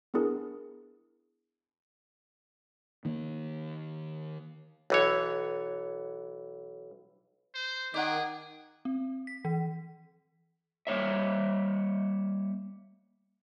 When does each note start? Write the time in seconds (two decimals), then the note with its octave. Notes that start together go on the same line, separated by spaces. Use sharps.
0.14 B3 D4 E4 G#4 A#4
3.05 D#3 A#3
4.90 B1 E3 C#5
7.55 C5
7.94 D#3 G#4 D5 F#5
8.85 C4
9.27 B6
9.45 E3
10.87 G3 A#3 C#5 E5